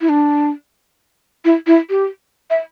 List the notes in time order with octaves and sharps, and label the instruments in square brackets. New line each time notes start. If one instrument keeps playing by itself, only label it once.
[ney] E4
D4
E4
E4
G4
E5